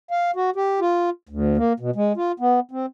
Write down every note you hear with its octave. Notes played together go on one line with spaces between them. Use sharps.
F5
F#4
G4
F4
D2
A#3
B2
G#3
F4
B3
C4